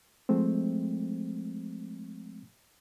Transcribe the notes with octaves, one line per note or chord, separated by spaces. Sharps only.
F3 G#3 A3 C4